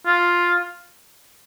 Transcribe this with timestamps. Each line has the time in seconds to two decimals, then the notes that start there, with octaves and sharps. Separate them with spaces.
0.06 F4